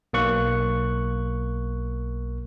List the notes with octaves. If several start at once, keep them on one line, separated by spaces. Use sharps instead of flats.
B1 A#3 C#6 F#6